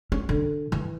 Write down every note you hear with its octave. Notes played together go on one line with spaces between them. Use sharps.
C#4
D3
E3